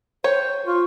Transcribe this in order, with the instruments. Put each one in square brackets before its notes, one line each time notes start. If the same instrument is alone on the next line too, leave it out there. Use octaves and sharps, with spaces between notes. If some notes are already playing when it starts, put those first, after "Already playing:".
[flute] C5 [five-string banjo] C#5 G5
[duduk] F4 [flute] C#6